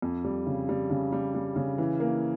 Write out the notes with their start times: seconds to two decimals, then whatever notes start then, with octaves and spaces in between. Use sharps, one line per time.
0.02 F2
0.25 G3
0.46 C#3
0.69 G3
0.90 C#3
1.12 G3
1.34 G3
1.56 C#3
1.78 E3
2.00 A#3